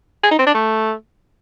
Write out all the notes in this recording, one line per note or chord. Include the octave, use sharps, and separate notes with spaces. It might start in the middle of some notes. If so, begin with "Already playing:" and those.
G#4
D#4
C4
D4
A3